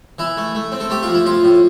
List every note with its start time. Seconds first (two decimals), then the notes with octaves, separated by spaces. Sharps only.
0.19 E3 E4
0.37 A3
0.55 A3
0.72 C4
0.80 A4
0.90 A3 G4
1.03 F4
1.09 F3
1.14 E4
1.25 F3 F4
1.44 A2